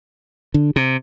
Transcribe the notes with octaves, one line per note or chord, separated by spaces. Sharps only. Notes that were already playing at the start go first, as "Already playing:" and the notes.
D3
C3